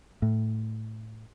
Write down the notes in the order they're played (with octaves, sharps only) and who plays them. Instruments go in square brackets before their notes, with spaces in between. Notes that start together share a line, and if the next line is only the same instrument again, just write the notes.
[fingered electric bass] A2